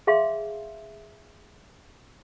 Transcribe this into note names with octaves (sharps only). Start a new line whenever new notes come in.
G#4 E5 F5 C6